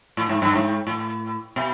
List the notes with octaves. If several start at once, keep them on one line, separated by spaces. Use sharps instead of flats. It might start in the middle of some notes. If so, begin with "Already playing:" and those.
A2
G#2
G2
G#2
A2
B2